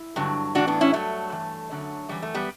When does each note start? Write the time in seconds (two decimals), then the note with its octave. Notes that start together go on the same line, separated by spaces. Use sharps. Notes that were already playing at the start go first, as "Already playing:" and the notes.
Already playing: E4
0.16 G2 D3 F#3
0.55 A2 E3 D4 F#4
0.67 B3 D4
0.81 C#4 E4
0.93 G2 F#3 A3
1.32 G2 E3
1.70 F#2 D3 F#3
2.09 F#2 E3 G3
2.22 A3
2.34 G3 B3